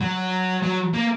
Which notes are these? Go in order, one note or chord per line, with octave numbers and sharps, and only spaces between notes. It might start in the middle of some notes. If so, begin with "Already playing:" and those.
F#3
F#3
A#3